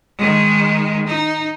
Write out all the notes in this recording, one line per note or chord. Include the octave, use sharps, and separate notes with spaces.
D#3 G#3
D#4